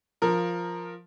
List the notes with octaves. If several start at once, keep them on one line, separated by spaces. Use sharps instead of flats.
F3 A#4